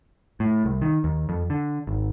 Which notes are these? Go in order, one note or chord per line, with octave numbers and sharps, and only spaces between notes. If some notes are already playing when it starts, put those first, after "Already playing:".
A2
C2
D#3
D#2
F2
D3
G#1